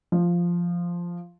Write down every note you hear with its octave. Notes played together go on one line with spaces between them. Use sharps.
F3